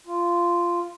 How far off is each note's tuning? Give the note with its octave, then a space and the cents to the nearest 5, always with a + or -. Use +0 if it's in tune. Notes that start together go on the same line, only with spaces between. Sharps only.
F4 -10